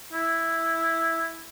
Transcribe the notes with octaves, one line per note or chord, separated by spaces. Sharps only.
E4